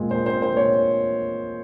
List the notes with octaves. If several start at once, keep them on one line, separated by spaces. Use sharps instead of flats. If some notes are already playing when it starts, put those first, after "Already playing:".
Already playing: A#2 G#3 C4
A#2 C5
C5
C4
C5
A#2 C#5